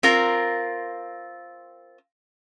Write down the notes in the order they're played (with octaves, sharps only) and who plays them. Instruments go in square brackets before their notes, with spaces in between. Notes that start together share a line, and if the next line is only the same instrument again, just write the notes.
[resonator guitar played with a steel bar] C4 F4 A#4